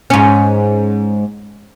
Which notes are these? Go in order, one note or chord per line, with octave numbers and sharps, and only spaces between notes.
G#2 C#4